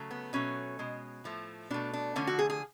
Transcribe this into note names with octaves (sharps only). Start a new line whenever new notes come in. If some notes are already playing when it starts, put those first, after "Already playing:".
Already playing: C#3 F#3 A3
B3
B2 F#3 A3 C#4
B2 G#3
A2 F3 A3
B2 A3 D4
D4
D3 F3 A3 C#4
F#4
G#4
G#4